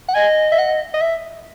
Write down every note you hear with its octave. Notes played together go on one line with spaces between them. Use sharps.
F#5
D#5 G#5
E5
F#5
D#5
E5